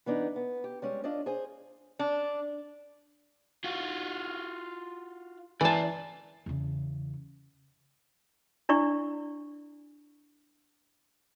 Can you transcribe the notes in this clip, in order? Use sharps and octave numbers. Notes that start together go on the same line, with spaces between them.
E3 B3 D4 D#4
B3
G4
G3 G#3 C#4
D4 F4 D5 D#5
G#4 C5 G#5
D4
F4 F#4
E3 D5 A5 A#5
E2 C#3
D4 E4 D5 C#6